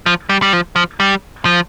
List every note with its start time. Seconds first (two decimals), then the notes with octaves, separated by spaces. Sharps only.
0.06 F3
0.29 G3
0.42 G3
0.53 F3
0.76 F3
1.00 G3
1.45 F3